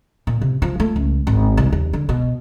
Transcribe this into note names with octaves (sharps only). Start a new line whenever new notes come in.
A#2
C3
F3
A3
C#2
G#1
C2
D#2
D3
B2